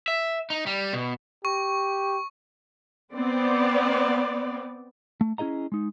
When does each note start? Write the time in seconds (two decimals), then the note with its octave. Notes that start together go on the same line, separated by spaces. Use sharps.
0.08 E5
0.50 D#4
0.66 G3
0.93 B2
1.45 G4 C#6
3.14 B3 C4 D5
5.21 A3
5.38 C#4 E4 G#4 D#5 A#5
5.72 G#3 D#4